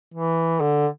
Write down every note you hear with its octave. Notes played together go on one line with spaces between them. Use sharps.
E3
D3